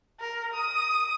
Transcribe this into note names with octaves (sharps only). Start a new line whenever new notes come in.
A#4
D#6